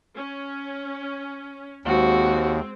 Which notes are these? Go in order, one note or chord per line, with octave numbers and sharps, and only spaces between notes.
C#4
D#2 G#3 C4 F#4